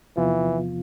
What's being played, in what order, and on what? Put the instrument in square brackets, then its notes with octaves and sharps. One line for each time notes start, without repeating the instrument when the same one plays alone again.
[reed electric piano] E2 C3 F3 B3 F4 [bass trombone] E3